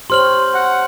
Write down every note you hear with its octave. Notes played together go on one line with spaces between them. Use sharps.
G4 C5 C#5 C6 F6 F#7
F#5